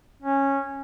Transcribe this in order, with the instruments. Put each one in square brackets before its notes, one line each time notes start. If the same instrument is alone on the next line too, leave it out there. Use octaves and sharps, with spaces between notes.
[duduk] C#4